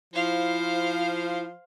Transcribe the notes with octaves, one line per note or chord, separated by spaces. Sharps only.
F3 E4 C5 F5